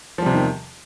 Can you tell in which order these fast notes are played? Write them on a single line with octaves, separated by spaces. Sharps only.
F3 G3 C3 E2 D#3